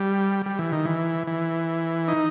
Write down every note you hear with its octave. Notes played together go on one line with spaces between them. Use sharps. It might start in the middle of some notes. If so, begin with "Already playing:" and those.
Already playing: G3
G3
E3
D#3
E3
E3
D#4